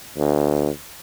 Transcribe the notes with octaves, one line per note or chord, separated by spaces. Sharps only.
D2